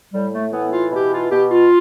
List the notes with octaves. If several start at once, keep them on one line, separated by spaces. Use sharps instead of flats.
A2 G3
A3
E3 B3
F4
B2 G4
F4
B2 G4
F4